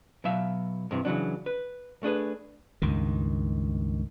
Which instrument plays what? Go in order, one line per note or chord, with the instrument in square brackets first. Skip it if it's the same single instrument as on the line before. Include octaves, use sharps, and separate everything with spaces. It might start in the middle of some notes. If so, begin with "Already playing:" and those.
[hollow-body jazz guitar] B2 F#3 E5 F5
G2 C3 E3
C#3 E3 F#3 D4
B4
A3 D4 G#4 B4
[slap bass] C#2 G2 D#3